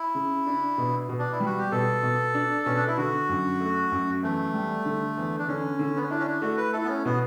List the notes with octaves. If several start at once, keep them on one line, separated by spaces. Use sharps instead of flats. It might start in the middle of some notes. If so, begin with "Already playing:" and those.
Already playing: E4
C#3
D4
B2
B2
D4
E4
G3
F#4
G4
B2 A4
B2
D4
B2 C#4
D4
E4
D3 F#4
F#2
A3
F#2
E2 A3
G3
D3
E2
D4
D3 C#4
D3
B3
C#4
D4 E4
C#4
D4
A3 F#4
B4
E4 A4
B3
C#4
B2 B3